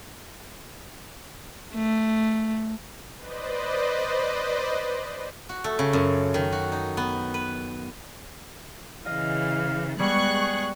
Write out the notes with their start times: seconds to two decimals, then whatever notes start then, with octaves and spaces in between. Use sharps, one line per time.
1.74 A3
3.16 B4 C5 D5 D#5
5.49 F#4
5.64 A3
5.79 C#3
5.93 F#2
6.34 D#3
6.52 F#4
6.72 D#4
6.97 B3
7.34 B4
9.06 C#3 E3 D#5 F5
9.99 G3 G#3 B3 G#4 C#6 F#6